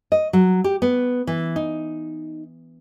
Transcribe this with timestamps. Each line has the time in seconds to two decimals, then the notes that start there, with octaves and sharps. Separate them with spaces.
0.12 D#5
0.33 F#3
0.64 G4
0.82 B3
1.27 E3
1.56 D#4